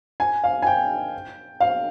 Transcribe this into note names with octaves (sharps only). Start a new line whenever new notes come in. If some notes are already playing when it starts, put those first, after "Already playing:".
G#5
F5
G#5
G5
F5